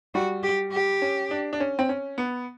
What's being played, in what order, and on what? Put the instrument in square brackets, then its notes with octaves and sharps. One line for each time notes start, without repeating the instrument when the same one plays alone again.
[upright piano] G3 [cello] F#4
[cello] G4
G4
[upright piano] C#4
D4
D4
C#4
C4
C#4
B3